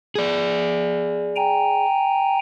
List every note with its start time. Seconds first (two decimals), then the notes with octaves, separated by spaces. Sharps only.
0.15 G#4 D5
1.36 G5 G#5 A#5